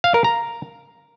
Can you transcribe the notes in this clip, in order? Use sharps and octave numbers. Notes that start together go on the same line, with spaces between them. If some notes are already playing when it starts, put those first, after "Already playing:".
F5
A#4
A#5